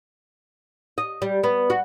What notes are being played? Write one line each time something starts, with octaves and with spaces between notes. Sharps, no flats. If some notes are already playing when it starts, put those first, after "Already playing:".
D#5
G3
B3
F#4